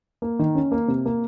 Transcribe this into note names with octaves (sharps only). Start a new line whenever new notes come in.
A#3
D#3
C#4
A#3
C3
A#3